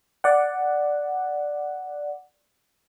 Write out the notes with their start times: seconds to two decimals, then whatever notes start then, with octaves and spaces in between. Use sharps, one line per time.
0.24 D5 F#5